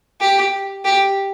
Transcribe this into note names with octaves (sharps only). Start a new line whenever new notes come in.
G4
G4